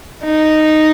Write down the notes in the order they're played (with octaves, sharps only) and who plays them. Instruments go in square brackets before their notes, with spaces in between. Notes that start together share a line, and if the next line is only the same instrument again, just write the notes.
[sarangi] D#4